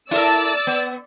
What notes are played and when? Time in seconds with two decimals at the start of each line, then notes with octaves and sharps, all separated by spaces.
0.11 E4 A4 A#4 D5 E6 A6
0.67 B3